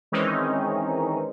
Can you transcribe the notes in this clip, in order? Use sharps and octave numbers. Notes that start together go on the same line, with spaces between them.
D#3 E3 G#3 C4 C#4 D#4